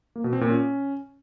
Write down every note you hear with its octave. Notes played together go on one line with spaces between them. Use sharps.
A#3
B2
C4
A#2
C#4